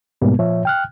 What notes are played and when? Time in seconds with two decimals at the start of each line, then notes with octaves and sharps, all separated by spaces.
0.21 G#2 B2 G3 G#3 A#3 B3
0.39 A#2 F3 C#5 E5
0.65 G5 F6 F#6